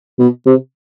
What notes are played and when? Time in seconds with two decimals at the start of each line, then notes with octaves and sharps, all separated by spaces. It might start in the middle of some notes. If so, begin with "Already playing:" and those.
0.19 B2
0.46 C3